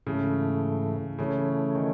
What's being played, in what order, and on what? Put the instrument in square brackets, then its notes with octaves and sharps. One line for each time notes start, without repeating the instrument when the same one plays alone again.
[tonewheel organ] G#2 E3 A3 [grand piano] C#3
[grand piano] C#3 [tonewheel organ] E3 A3 C#4
[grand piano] D#3